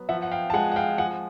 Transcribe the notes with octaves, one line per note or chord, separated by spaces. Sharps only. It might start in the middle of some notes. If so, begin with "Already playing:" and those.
Already playing: F#3 B3
F3 E5 F#5
F#5
F5 G5
A5
G#3 F#5 G#5
F#5
F5 G5
F3 F#5 G#5